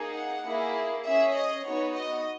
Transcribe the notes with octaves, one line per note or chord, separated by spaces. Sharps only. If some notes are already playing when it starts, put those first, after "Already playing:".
Already playing: A#3 D#4 G#4
F#5
A#3 E4 G#4
C#4 G#4 E5
D#5
B3 D#4 F#4 C#5
D#5